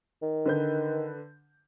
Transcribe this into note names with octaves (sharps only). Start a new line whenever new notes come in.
D#3
D3 B4 G6